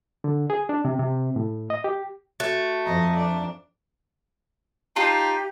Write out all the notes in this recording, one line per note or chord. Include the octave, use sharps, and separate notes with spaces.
D3
G#4
D4
C3
C3
A2
D#5
G4
A3 F#4 F#6
F2 D#5 A#5
D4 D5
D#4 F4 G4 A5 C6